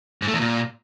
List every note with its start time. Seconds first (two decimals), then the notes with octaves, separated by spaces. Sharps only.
0.22 G#2
0.28 A3
0.34 E2
0.40 A#2